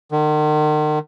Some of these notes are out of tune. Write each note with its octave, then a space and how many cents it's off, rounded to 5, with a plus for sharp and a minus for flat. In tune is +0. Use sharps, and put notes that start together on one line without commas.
D#3 -40